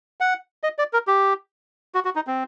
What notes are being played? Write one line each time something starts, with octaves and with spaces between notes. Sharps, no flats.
F#5
D#5
D5
A#4
G4
F#4
F#4
D#4
C4